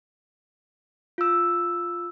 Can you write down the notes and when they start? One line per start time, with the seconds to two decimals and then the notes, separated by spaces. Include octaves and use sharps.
1.18 F4 E6